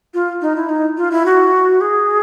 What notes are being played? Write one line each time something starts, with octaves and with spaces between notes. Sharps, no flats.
F4
D#4
E4
D#4
F4
E4
F#4
G#4